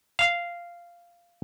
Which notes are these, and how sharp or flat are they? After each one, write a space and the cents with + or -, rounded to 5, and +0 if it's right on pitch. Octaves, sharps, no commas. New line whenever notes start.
F5 -10